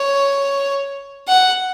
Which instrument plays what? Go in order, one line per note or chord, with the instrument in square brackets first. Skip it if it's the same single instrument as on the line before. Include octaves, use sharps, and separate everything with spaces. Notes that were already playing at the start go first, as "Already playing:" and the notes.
Already playing: [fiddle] C#5
F#5